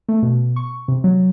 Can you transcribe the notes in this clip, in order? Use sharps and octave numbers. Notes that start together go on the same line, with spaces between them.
A3
B2
C#6
C3
F#3